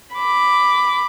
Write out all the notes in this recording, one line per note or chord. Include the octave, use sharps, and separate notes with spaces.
B5 D6